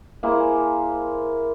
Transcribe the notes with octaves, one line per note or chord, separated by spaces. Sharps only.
A#3 E4 G#4 C5